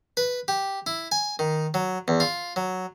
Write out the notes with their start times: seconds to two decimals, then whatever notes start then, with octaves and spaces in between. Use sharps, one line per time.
0.17 B4
0.48 G4
0.87 E4
1.12 G#5
1.39 D#3
1.74 F#3
2.08 E2
2.20 F4
2.56 F#3